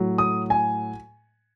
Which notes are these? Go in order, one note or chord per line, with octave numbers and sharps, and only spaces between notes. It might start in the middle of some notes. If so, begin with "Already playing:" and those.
Already playing: A2 F#3
D#6
G#5